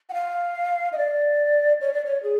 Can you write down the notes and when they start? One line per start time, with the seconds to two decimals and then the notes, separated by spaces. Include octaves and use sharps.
0.09 F#5
0.13 F5
0.93 D#5
0.98 D5
1.81 C#5
1.93 D5
2.05 C#5
2.23 G#4